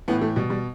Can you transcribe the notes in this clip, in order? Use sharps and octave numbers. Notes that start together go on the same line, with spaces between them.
A2 E3 B3
A3
B2 G3
G3